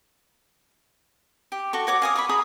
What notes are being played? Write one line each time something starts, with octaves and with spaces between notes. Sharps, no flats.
G4
F#4 A4 C#6
F#4 C#5 D6
F5 G#5 D#6
B5 C#6 D6
G#4 A#5 B5 D#6